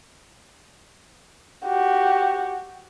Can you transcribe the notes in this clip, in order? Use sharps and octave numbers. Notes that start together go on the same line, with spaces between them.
F#4 G4